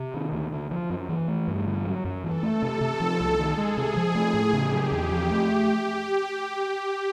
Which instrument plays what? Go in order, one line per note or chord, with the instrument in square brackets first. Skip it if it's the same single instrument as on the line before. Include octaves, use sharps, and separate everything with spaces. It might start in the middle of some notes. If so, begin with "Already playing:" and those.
Already playing: [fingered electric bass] C3
D#3
D2
D3
F3
F#2
E3
A3
G2
D3
F#3
F#2
[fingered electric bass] E3 [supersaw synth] A4
[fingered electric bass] A3
C3
C3
F3
C2
[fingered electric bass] D#3 [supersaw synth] G#4
[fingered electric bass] G#3
C3
F3
A3
A2
[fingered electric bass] C#3 [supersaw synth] G4
[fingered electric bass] F#3
E2
F3
A3